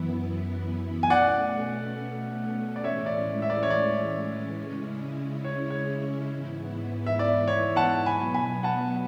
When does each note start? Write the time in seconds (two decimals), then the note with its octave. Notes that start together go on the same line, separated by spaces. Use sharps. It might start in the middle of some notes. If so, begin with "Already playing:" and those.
Already playing: F#2 E3 B3 E4
1.03 G#5
1.10 B2 A3 C#4 D5 F#5
2.76 D5
2.84 A2 E3 G#3 C#4 C#5 E5
3.06 D5
3.42 E5
3.50 D5
3.63 C#5
3.70 D5
4.58 C#3 G#3 C#4 E4
5.44 C#5
5.70 C#5
6.32 G#2 E3 B3 E4
7.06 E5
7.19 D5
7.48 C#5
7.76 F#5 A5
8.06 B2 F#3 B3 G#5 B5
8.34 G#5 B5
8.63 F#5 A5